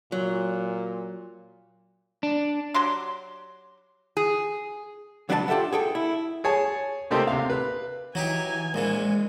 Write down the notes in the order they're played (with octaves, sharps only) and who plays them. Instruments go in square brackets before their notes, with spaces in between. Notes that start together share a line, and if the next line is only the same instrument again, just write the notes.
[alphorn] A#2 [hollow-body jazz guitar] F#3
[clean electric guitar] D4
[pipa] F#3 G4 C6
[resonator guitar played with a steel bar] G#4
[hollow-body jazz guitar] C#2 F#3 D4 B4 E5 A5
F4 G4 A4 E5 F#5
G#4 A4 G5
E4
[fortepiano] G#4 C#5 G#5 A5
C3 A3 A#3 C4 D#4 G4
C3 F5
B4
[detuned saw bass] E3 [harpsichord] F#3 D#4 G4 [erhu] G#5
[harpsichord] A#1 A#2 E3 [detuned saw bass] G#3